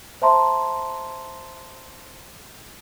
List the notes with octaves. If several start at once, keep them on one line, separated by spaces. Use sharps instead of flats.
C5 E5 A5 A#5 C6